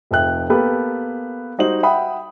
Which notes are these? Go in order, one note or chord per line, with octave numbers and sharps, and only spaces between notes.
F1 F2 E5 G5 F#6
A#3 B3 G4 A4 B4
G3 D#4 F#4 C5 F#7
E5 F#5 G5 B5 D#6